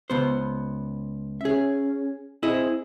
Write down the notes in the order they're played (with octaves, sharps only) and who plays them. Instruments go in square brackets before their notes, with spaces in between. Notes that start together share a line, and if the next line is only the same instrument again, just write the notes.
[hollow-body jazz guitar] C#2 B3 C5
[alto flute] C#4 [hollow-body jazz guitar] G#4 E5
[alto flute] C4 [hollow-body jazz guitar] E4 G#4 D#5